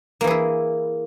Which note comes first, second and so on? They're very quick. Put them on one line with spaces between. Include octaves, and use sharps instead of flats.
A#3 E3 G#4 E4